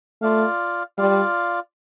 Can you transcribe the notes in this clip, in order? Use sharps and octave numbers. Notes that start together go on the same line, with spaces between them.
A3 F4 D5 F5
G3 F4 D5 F5